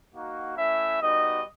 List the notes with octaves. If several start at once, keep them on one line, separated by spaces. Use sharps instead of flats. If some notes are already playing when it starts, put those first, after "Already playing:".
A#3 D#4 F#4
A3 C#4 E4 E5
G3 B3 D#4 F#4 D#5